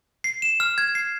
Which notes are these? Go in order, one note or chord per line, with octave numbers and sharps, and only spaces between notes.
C7
E7
F6
G#6
C7